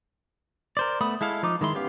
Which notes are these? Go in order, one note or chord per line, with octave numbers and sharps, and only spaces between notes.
A#4 C5 D5
A3 B3 B5 D#6
G#3 E4 A4 F5
F3 D#4 D6
D#3 G#3 E4 C6
B3 C#4 G4 B4 F5